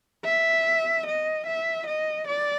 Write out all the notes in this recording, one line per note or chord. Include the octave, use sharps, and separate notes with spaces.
E5
D#5
E5
D#5
D5